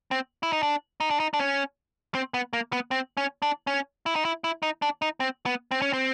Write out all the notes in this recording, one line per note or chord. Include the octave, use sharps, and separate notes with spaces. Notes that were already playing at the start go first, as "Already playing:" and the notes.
C4
E4
D#4
D4
D#4
D4
D#4
D4
C#4
C4
B3
A#3
B3
C4
C#4
D4
C#4
E4
D#4
E4
E4
D#4
D4
D#4
C4
B3
C4
C#4
C4